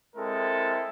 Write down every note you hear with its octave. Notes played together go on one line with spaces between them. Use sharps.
G#3 C4 E4 A4 A#4